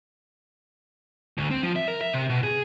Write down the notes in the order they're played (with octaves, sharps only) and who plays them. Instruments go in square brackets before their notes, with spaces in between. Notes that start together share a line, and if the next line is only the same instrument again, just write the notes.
[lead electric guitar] D2
C4
F3
E5
A#4
E5
C3
B2
G#4